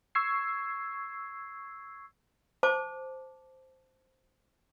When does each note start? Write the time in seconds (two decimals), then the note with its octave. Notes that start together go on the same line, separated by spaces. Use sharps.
0.15 C#6 E6 G#6 C7
2.63 C5 A5 D6